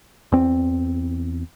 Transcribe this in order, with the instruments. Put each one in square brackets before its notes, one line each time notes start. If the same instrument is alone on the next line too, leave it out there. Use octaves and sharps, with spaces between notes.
[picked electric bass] E2 C4